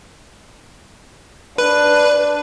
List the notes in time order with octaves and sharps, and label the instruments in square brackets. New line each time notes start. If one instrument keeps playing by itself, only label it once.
[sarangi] D4 [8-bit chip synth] B4